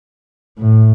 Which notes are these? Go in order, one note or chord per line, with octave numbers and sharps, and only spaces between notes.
A2